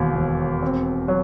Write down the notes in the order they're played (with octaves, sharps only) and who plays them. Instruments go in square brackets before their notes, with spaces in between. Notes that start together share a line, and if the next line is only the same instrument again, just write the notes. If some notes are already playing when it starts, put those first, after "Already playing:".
Already playing: [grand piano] E1 D#2
E1
C4
F#3